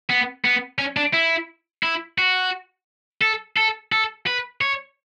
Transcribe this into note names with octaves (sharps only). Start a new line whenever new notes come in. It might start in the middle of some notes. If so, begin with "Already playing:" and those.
B3
B3
C#4
D4
E4
E4
F#4
A4
A4
A4
B4
C#5